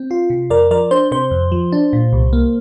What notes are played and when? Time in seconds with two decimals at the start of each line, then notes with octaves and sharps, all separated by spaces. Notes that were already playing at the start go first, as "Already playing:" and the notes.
Already playing: C4
0.11 F4
0.30 C3
0.50 F2 A#4 D5
0.71 F3 A#4 D5
0.91 D4 C5
1.11 C3 C5
1.31 F2
1.52 F3
1.72 D4
1.93 A#2
2.13 C2
2.33 A#3